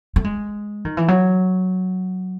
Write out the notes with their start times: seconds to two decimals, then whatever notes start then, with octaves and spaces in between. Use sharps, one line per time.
0.16 A3
0.24 G#3
0.85 D#3
0.97 E3
1.08 F#3